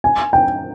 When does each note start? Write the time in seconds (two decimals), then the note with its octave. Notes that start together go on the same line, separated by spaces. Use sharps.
0.04 G#5
0.33 G5